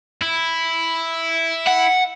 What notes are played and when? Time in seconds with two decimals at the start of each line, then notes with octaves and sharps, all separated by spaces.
0.22 E4
1.67 F#5